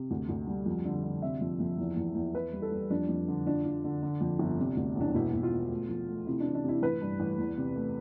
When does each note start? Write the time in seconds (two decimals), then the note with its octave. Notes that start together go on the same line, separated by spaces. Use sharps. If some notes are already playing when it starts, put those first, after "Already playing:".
Already playing: C3
0.11 D2
0.29 D2
0.47 G3
0.66 F2
0.85 D3
1.03 D3
1.22 C3 E5
1.41 F2
1.60 F2
1.78 E2
1.97 E2
2.15 E2
2.34 E2 B4
2.53 G3
2.62 A4
2.72 G3
2.90 F2 D4
3.08 F2
3.28 D3
3.46 F3 D4
3.65 F3
3.84 D3
4.03 D3
4.21 F2
4.39 G1
4.59 C3
4.77 D2
4.96 E1 D4
5.14 B2 E4
5.34 B2
5.43 F4
5.52 B2
5.70 A3
5.89 F3
6.08 A3
6.26 C3 E4
6.40 E3 D4
6.55 D4
6.64 C3 E4
6.82 A1 B4
7.01 G2
7.20 A1
7.38 E2
7.57 C3
7.76 A3